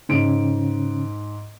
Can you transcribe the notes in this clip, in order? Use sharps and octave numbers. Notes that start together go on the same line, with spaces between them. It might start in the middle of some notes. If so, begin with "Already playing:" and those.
G#2 C#3 C#4 D7